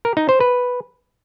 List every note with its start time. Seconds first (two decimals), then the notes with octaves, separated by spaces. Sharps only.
0.05 A#4
0.17 D#4
0.29 C5
0.40 B4